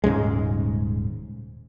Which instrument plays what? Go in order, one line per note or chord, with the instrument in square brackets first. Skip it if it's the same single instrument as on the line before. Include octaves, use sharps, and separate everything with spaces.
[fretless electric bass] D#1 G#2 C#3 G#3